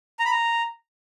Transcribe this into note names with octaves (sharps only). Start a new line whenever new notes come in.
A#5
B5
A#5